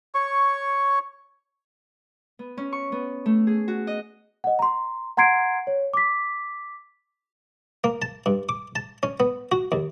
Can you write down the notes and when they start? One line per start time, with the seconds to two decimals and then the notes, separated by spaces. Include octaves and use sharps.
0.15 C#5 C#6
2.39 B3
2.57 C#4
2.73 C#6
2.92 B3
3.26 A3
3.47 G#4
3.68 F#4
3.87 D#5
4.44 D#5 F#5
4.59 A#5 C6
5.17 F#5 A#5 C6 G#6 C7 D7
5.67 C#5
5.94 D6 B6
7.84 A#3
8.02 A5
8.26 G2
8.49 D6
8.76 A5
9.03 C#4
9.20 B3
9.52 F#4
9.72 D#2